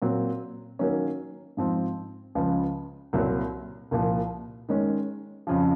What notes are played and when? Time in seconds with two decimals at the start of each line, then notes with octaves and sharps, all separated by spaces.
0.02 A#2 F#3 C4
0.79 D#3 F#3 A#3 C#4
1.57 G#2 F3 C4
2.35 C#2 C#3 F3
3.13 C2 A#2 F#3 C4
3.91 C2 A#2 F3
4.69 D#3 G#3 C#4
5.47 F2 C#3 F3